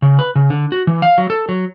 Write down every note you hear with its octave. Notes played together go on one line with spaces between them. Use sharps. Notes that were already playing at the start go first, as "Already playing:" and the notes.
C#3
B4
C#3
D3
F#4
E3
F5
F#3
A4
F#3